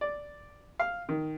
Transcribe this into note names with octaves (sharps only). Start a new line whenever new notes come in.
D5
F5
D#3